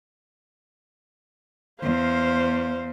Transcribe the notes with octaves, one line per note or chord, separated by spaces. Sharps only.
E2 C5 F5